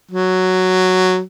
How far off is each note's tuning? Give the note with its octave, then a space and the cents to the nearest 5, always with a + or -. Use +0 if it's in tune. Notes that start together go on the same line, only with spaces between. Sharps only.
F#3 +0